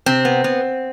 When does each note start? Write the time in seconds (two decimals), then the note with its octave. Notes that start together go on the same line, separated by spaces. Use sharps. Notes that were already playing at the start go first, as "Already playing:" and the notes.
0.06 C3 C4
0.25 B3
0.44 B3